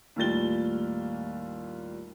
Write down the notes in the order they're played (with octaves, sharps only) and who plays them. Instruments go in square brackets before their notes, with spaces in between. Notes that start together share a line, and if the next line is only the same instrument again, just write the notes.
[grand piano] D#2 A2 G3 F4 A6 G7